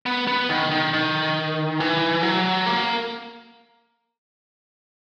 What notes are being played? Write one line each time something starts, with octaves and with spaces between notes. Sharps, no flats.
B3
B3
D#3
D#3
D#3
E3
F#3
A#3